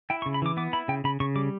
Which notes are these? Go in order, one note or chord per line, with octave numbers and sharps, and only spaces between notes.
E4 G5
C#6
C#3
B5
E3 D6
B3 D6
E4 B5
C#3 G5
C#3 B5
C#3 C#6
G3 D6